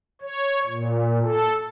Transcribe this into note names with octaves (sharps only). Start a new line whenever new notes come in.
C#5
A#2
A4